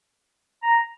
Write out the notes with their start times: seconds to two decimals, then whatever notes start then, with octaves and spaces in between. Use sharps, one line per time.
0.63 A#5